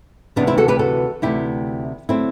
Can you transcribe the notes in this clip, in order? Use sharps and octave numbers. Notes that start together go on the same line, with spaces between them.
D2 C3 E3 B3 D4
C4 E4
F#4 A4
G4 B4
F#4 A4
D2 C3 E3 A3 E4 G4
D3 F#3 A3 C4 E4